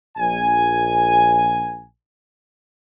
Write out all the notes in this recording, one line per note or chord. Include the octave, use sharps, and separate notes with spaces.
A#1 G#5